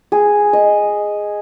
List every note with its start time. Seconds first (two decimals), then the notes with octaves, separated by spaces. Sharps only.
0.12 G#4
0.53 D#5